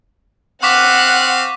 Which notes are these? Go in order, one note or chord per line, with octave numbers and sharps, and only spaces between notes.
C4 F5 F#5 C#6 D6 F#6 B6